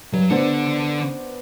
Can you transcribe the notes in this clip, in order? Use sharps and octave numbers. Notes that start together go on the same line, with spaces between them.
G2 F#3
D3 B3 D4 C5 F#5